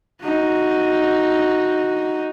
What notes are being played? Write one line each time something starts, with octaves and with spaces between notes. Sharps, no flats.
D#4 F#4